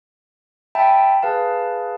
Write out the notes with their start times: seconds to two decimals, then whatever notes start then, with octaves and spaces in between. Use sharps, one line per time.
0.75 E5 G5 A5 B5
1.22 G#4 B4 F5 A5